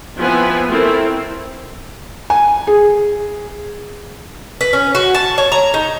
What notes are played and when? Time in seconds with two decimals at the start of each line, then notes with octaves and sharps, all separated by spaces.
0.17 F3 B3 C4 E4 B4 G#5
0.69 A3 C4 E4 A4 A#4
2.30 G#5
2.67 G#4
4.61 B4
4.73 C#4
4.95 F#4
5.14 A5
5.38 C#5
5.52 A#5
5.74 D#4